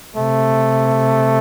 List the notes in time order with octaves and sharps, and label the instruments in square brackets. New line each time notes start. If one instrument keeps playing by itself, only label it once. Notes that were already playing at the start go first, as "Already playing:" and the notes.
[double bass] C3 [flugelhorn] A3